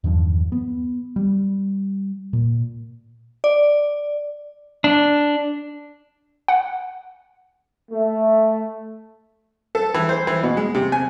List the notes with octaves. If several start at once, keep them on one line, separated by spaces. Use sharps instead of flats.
E2 G2 D#3 F3
B3
G3
A#2
D5
D4
F#5
A3
A4
E3
C5
E3
B2
G#3
C3
G#5